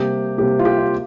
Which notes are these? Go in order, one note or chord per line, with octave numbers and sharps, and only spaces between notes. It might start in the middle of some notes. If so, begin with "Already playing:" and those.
Already playing: C3 G3 A#3 G4
C3 G3 A#3 G4
F4
G4
F4